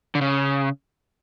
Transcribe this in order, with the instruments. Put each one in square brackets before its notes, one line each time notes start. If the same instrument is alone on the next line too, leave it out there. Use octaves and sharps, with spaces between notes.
[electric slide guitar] D3
C#3